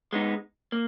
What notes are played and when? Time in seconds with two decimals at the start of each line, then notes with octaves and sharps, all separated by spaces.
0.13 G#3 B3 D#4
0.72 A#3